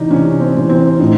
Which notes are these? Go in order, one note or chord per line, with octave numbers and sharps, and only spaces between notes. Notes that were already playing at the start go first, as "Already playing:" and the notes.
Already playing: C3 E3 D4 D#4
C3 C#4
C4
E3
C4
A2 D#4